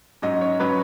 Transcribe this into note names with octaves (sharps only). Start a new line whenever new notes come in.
G#2 F#3 C#4 D#5
C#5
F#3 C#4 B4